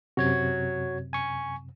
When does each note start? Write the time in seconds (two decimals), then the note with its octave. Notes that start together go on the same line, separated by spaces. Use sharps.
0.17 F#2 C3 F#4 C#5 G#6
1.13 G#5 C#6